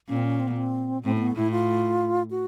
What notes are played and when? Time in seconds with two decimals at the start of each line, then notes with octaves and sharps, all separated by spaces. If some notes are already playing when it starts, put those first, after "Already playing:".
0.08 A#2 C#4
0.17 C4
0.24 C#4
0.40 C4
0.48 B3
0.56 C4
1.04 A2 C4
1.15 C4
1.20 B3
1.36 A2 E4
1.51 F4
2.31 F#4